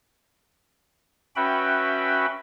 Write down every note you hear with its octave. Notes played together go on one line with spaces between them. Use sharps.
C#4 F#4 B4 E5 G5 B5